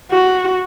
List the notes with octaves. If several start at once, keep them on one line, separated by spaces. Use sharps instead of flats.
F#4